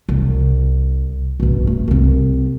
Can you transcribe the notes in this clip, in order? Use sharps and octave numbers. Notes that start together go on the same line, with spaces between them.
C2
B1 G2
A3
C2 C4